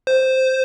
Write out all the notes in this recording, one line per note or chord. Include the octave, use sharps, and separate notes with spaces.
C5